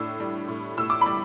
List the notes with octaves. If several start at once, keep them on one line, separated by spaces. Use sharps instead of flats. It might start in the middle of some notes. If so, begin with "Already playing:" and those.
Already playing: A2 D4 E6
G3
A2
A2 E6
D6
G3 B5